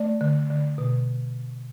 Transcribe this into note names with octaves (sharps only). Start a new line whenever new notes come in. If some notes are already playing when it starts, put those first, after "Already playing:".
Already playing: A3 D5
D3
D3
B2